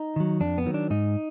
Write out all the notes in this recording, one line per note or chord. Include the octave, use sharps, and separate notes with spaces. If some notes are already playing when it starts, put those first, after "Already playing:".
Already playing: D#4
D#3 F#3
F2 D4
B3
D#3 F#3
D4
G#2 D#4